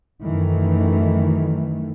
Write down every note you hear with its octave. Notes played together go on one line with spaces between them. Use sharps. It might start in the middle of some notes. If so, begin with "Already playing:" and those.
F#2 D#3 E3 A3